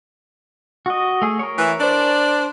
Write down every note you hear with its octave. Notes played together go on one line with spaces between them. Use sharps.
F#4 D#5
A3 G#4
A#4 C#5
E3
D4 C5 D5